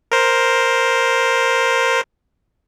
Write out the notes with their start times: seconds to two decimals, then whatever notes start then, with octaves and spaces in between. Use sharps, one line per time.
0.12 A#4 C5